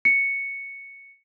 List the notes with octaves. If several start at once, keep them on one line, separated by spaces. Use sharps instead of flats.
C#7